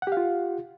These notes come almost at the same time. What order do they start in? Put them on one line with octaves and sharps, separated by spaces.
F#5 G4 F5 F4